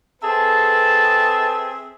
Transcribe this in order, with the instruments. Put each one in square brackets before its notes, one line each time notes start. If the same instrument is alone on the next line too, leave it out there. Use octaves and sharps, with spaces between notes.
[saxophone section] C4 G#4 E5 [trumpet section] A4 B4 A5